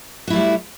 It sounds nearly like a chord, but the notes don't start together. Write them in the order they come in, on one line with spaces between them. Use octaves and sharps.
F#4 E4 A3 G3